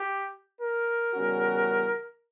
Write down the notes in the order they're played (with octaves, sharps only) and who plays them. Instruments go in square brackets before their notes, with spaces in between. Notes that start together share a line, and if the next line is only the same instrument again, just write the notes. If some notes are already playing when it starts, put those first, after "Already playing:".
Already playing: [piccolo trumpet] G4
A#4
[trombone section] E2 C#3 G3 C#4 F#4